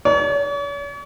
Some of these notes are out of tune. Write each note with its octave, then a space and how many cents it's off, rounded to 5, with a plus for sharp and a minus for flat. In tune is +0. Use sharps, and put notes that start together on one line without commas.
C#5 +45